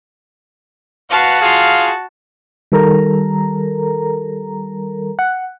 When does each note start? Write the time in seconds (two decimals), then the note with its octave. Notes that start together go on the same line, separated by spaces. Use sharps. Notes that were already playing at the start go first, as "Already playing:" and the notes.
1.10 F#4 B4 F5 A5
1.40 F4 G#4 F5
2.72 D#3 G3 A4 A#4 A#5
5.19 F#5